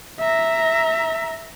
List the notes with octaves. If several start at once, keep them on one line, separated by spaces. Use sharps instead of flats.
E5 A#5